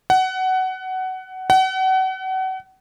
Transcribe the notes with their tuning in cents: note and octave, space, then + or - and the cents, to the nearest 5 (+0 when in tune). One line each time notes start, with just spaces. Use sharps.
F#5 +20
F#5 +35